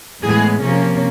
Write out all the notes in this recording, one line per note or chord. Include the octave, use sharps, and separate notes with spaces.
A2 E3 G#3 B3 G#4
C3 F3 A#3 C#4